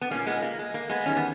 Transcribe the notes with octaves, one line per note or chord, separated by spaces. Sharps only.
B3
A#2 G3 A#3 C#4
G#3 B3
A#3
G#3
A#3
G#3 B3
E2 D#3 G3 C#4
B3